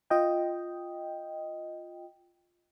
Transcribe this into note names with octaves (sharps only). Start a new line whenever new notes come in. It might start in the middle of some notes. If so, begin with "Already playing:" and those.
F4 D#5 G5